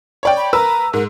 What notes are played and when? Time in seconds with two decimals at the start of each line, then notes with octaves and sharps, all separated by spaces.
0.23 C#5 D5 G5
0.37 B5
0.53 A#4 B4 A#5 E6
0.93 G#2 A#4